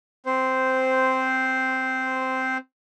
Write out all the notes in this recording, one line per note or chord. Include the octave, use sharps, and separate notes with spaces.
C4 C5